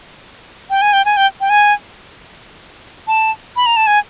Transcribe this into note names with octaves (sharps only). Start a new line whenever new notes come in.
G5
G#5
G5
G#5
G5
G5
G#5
A5
B5
A#5
A5
G#5